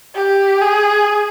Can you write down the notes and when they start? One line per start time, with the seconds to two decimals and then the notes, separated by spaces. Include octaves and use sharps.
0.15 G4
0.61 G#4